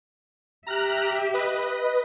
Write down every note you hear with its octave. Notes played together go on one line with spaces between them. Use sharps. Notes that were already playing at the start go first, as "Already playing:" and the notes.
G4 E5 A#5 F6 F#6
B4 D#5